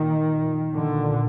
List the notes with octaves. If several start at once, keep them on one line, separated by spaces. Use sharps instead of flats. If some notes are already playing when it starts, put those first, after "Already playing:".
Already playing: A#2 D#3
A#2 D3